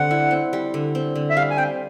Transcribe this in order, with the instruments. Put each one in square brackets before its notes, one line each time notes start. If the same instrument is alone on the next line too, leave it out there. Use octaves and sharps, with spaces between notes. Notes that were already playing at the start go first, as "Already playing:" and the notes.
Already playing: [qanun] D3 G3 C4 [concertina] F#5
[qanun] E4
C4
G3
D3
C4
D3
[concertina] E5
[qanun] G3 [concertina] F5
[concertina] G#5
[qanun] C4 [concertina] G5